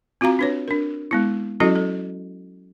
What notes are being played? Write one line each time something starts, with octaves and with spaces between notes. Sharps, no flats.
C4 F4 F#4 F5 A#5
D4 B4 C#5
D4 A#4
G#3 B3 E4
F#3 C#4 E4 F#4 A4 D#5
A4